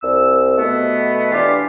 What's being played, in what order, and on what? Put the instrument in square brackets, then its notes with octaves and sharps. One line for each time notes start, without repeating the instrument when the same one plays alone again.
[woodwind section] C2 E6
B2 A3 B3
E3 D4 F4 G4